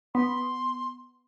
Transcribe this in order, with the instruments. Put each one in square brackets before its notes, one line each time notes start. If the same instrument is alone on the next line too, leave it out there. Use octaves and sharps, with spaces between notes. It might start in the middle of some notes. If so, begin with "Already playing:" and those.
[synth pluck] B3 [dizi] C6